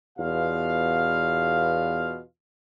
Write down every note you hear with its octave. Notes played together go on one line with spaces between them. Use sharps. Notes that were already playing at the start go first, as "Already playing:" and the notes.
E2 B2 F4 F5